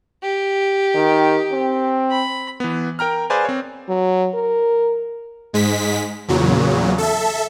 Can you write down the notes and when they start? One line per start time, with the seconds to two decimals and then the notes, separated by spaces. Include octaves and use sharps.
0.22 G4
0.95 D#3
1.52 C4
2.10 B5
2.60 E3 B3
2.99 A#4 G5 A#5 F6
3.30 G#4 B4 C5 D5 F5 G#5
3.45 C4 C#5
3.89 F#3
4.35 A#4
5.53 G#2 G#3 B6
6.28 E2 A#2 C#3 F#3
6.98 A4 E5